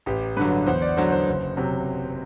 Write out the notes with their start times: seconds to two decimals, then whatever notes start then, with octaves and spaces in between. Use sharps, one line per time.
0.06 A1 G4
0.37 G2 D3 F#3 B4
0.66 E2 C5
0.82 D5
0.97 D3 F#3 C5
1.12 C5
1.27 F#1
1.57 C3 F#3